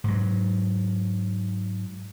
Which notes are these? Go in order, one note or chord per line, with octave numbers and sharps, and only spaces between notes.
G#2 F#3